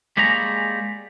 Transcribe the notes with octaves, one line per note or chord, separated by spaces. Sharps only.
G3 G#3 A#3 G#4 C#5 A#5